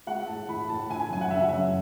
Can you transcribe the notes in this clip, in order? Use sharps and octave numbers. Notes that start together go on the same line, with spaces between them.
G#3 F#5
A2 A5
E3 B5
A2 A5
E3 G#5
G#5
F#2 G#5
F#5
C#3 E5
F#5
F#2 E5